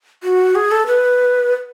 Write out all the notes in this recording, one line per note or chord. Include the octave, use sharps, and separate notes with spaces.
F#4
G#4
A4
B4